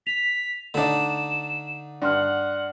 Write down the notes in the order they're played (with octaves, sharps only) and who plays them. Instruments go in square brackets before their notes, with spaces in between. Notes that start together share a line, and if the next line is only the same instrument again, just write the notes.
[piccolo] B6 [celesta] F7
[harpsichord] D3 D#4 [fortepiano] A3 D4 [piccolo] E7
[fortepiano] G2 [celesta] D5 C6 F6 [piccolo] F#5